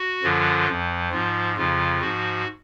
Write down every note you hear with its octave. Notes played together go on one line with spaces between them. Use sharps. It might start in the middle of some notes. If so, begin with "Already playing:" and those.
Already playing: F#4
F#2 D3 F3 F4
F2 F3
G#2 F3 F4
F2 C#3 F3 F4
G#2 F3 F#4